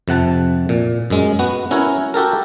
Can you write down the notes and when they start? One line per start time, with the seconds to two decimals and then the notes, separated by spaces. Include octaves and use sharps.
0.08 F2 C3 F#5 A5
0.69 A#2
1.10 F#2 G#3
1.39 B3 F#4
1.71 C#4 E4 F#4 A#4 C#5
2.14 F#4 G4 A4 A#4